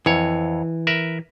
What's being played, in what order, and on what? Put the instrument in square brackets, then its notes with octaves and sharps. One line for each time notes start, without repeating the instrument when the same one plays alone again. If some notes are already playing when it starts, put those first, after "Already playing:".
[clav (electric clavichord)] F2 C#5 [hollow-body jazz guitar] E3
[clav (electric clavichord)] A#4 B4 E5